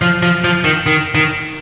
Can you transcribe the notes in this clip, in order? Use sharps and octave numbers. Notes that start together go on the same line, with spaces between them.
F3
F3
F3
D#3
D#3
D#3